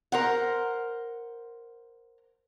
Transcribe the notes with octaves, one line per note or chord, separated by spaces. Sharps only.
A#4 C5 F#5